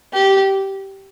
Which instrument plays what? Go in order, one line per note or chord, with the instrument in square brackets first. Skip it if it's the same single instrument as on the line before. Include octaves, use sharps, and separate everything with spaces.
[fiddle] G4